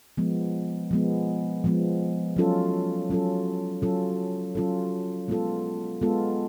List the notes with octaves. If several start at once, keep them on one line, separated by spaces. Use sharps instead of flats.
F3 G#3 B3
F3 G#3 B3
F3 G#3 B3
F#3 C#4 F4 A4
F#3 C#4 F4 A4
F#3 C#4 F4 A4
F#3 C#4 F4 A4
G#3 B3 F4 A4
G#3 B3 F4 A4